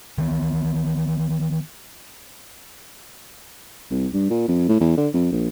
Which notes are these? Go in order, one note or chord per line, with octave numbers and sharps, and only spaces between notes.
D#3 E3 B3
C2
G2
A#2
F2
A2
E2
D3
F2
A#1